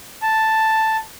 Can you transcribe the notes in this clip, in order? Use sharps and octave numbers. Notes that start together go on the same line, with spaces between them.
A5